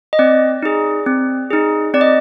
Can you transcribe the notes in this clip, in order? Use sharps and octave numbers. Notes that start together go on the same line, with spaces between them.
D#5
C4 D5
D#4 G#4
C4
D#4 G#4
C4 D5
D#5